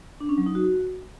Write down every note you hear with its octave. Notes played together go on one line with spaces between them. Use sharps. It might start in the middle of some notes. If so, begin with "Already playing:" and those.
D4
C#4
F#3
D#4
F#4